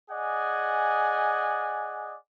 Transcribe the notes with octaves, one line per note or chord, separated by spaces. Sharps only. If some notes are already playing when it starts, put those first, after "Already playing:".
G#4 D5 D#5 F#5 G#5